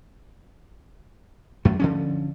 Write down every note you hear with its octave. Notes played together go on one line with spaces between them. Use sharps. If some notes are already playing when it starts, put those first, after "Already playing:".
F#2 A3
D3 F3 C#4